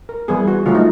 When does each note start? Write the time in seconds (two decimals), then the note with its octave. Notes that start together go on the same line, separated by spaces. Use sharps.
0.09 A#4
0.28 E3 G3 B3 G#4
0.47 F#4
0.66 D3 F#3 A3 F4
0.75 D#4